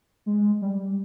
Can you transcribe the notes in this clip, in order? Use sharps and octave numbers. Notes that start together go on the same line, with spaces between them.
G#3
G3